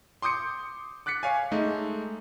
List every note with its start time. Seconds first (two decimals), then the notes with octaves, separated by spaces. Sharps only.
0.22 C6 D6 D#6 G6 C#7
1.06 D6 F#6 A6 B6 C#7
1.23 C#5 F5 G#5
1.51 G#3 A3 D#4